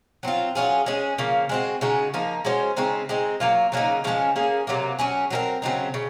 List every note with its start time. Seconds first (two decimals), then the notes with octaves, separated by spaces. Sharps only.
0.23 F#3 C4 F4
0.55 F#3 C#4 F4 G#4
0.86 G#3 C#4 G#4
1.18 C#3 F3 A#3
1.49 G#3 C4 F#4
1.81 C#3 G#3 D#4 F#4
2.14 F3 A#3 D#4
2.45 G#3 C#4 F#4 C5
2.77 C#3 G#3 C4 D#4
3.09 G#3 C4 D#4
3.40 F#3 A#3 F4
3.72 C#3 F#3 A#3 D#4
4.04 C#3 F3 G#3 C#4
4.36 A#3 C#4 G#4
4.67 C3 F#3 A#3
4.99 F#3 C#4 G#4
5.31 F#3 C4 D#4 A#4
5.62 C#3 F#3 C4 D#4
5.94 C#3